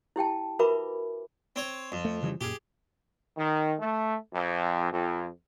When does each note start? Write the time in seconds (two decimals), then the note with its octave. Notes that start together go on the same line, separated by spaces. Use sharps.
0.16 E4 G4 G5 A5
0.59 F#4 A#4 B4 E5 B5 D6
1.56 C4 C#5
1.92 F2
2.05 A3
2.23 C#3 E3 G3
2.41 F#2 A#2 G4 G#4
3.37 D#3
3.80 A3
4.34 F2
4.92 F2